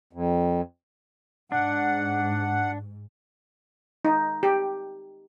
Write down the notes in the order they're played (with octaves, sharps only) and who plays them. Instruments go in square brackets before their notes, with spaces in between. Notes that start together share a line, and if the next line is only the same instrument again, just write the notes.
[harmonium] F2
[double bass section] G#2 [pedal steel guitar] D4 [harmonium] F#5
[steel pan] D#4
G4